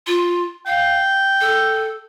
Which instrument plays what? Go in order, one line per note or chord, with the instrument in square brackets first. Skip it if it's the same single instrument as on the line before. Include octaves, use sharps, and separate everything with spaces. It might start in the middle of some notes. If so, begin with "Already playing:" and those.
[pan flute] F4
[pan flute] F5 [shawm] G5
[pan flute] A4